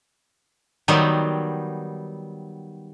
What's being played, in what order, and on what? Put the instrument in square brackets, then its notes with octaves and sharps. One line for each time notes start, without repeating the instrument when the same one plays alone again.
[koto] D#3 F#3 G3 B3